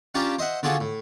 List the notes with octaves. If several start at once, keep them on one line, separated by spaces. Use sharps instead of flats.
C#4 D4 F4 G4 A5 A#5
C5 D#5 E5 F#5
D3 D4 F4 F#4 G#4 A4
A2